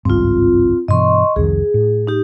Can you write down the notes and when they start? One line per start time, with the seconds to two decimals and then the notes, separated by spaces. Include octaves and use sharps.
0.05 G#1 C#2 G2 C4 F4
0.88 G2 B2 E3 D#5 C6 C#6
1.36 C2 F2 D#3 G#4
1.74 A2
2.07 D#4 G4